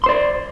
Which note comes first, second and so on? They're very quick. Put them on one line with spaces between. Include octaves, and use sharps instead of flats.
C6 C5 D5